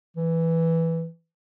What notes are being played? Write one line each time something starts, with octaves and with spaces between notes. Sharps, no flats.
E3